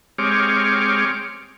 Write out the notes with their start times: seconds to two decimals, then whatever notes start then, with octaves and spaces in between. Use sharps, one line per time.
0.18 G#3 C4 G4 C#5 D6 F6